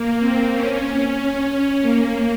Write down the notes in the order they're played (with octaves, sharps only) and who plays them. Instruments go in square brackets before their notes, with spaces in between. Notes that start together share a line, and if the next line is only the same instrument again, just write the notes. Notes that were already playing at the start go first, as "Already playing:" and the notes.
Already playing: [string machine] A#3
C4
C#4
A#3